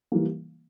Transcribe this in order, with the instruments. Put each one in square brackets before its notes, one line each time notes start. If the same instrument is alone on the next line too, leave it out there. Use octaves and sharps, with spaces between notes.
[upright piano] E3 G3 A#3